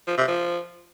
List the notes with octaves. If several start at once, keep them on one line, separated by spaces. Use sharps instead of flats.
F3
C3
F3